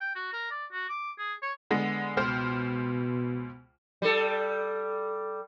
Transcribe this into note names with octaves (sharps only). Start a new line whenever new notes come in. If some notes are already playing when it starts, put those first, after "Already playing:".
G5
F#4
A#4
D5
F#4
D6
G#4
C#5
D3 G#3 B3
C#2 B2 C5 F6
G3 A4